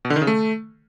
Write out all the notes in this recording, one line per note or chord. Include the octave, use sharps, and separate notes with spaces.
B2
D3
D#3
C#3
A3